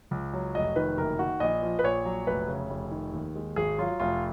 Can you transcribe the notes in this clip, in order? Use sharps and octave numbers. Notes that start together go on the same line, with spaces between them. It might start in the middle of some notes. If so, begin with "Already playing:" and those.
C#2
F#3
F1 D#5
D#3 B4
F#1 A#4
D#3 F#4
A#1 D#5
F3
B4
A#1 C#5
F#3
F1 B4
C#3
F1
D#3
D#2
G#3
G#1 G#4
F#3 F4
F1 F4